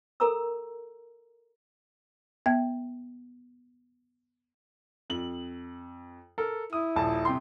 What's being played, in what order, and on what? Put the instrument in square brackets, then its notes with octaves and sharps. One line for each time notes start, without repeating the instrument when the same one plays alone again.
[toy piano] A4 A#4 A#5 E6
[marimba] B3 E5 G5 G#6
[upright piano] F2 F#7
A4 A#4
[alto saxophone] E4 [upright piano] D#6
[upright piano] D#1 A#1 A5
C3 G5 C6